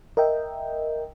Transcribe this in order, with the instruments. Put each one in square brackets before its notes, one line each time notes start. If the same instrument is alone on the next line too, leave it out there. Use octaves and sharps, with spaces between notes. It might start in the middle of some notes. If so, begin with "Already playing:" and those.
[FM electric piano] A#4 D#5 E5 G5